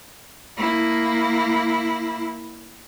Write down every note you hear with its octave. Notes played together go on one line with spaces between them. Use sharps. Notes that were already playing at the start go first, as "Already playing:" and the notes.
A#3 E4